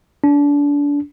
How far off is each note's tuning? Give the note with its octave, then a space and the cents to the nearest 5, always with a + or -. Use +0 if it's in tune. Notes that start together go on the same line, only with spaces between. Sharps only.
D4 -30